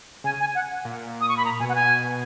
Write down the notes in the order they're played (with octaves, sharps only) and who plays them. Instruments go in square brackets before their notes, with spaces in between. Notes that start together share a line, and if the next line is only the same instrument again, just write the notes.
[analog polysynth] C#3 [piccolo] G#5
[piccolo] G#5
F#5
[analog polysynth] A#2
[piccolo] D#6
C#6
B5
[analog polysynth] A#2 [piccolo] A#5
[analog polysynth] B2 [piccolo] G#5
[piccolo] F#5
G#5